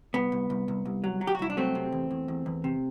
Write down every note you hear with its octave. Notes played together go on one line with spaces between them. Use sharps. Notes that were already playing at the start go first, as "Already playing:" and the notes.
C2 B3
C2
C2
C2
C2
F#3
F#3
G4
F#4
C2 E4
D4
F#3 A3 C4
C3
E2
E2
E2
E2
C3